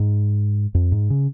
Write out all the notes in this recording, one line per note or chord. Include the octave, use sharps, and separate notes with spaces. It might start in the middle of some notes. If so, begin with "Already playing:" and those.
Already playing: G#2
F2
G#2
C#3